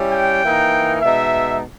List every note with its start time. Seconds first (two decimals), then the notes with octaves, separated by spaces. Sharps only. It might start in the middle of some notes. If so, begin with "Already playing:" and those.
Already playing: G3 C#4 E4
0.12 G5
0.42 E3 A#3 D#4
1.02 B2 G#3 D#4 E5